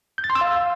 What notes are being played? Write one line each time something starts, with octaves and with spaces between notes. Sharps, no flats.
G6
A6
C6
E6
F5